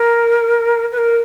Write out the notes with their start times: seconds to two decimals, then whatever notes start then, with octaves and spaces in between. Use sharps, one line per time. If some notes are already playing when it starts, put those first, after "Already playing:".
Already playing: A#4
0.92 B4
0.98 A#4